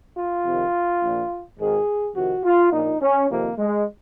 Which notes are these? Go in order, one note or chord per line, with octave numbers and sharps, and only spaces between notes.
F4
F2 C3 D#3
A#1 A#2
G#1 G#2 D#3 G#4
F2 C3 D#3 F#4
F4
A#1 A#2 D#4
C#4
F2 C3 D#3 A#3
G#3